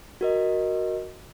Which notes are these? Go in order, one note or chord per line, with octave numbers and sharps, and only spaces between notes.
F#4 A#4 D#5